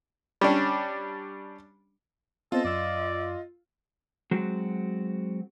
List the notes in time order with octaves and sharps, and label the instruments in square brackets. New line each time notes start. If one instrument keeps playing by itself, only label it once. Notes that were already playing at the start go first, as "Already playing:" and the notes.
[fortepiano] G3 C#4 D4
[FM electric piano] B3 C4 C5 [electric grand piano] F4 [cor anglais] A4 [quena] D#5
[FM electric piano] F#2 E6 [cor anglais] D5
[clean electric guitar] F#3 G#3 C4 F#4